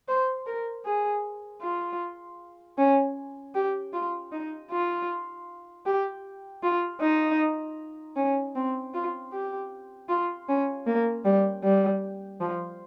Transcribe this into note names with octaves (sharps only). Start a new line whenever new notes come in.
C5
A#4
G#4
F4
C#4
G4
F4
D#4
F4
G4
F4
D#4
C#4
C4
F4
G4
F4
C#4
A#3
G3
G3
F3